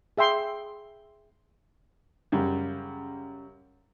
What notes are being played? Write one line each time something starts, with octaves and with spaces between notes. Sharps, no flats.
G#4 E5 G5 C6
F#2 C#3 G3